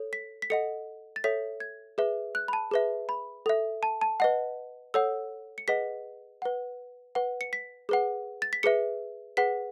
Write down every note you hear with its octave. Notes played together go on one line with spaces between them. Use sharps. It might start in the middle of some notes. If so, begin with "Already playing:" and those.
Already playing: A4 C#5
B6
B6
A4 D#5 F#5 C#7
A6
A4 C#5 E5 B6
G#6
G#4 B4 E5
F#6
B5
A5
G#4 B4 E5
B5
A4 E5
A5
A5
B4 D#5 F#5
A4 C#5 F#5 E6
C#7
G#4 B4 D#5 F#5 B6
B4 F#5
B4 F#5
C#7
B6
G#4 B4 F#5
A6
B6
G#4 B4 E5 C#7
G#4 B4 F#5 B6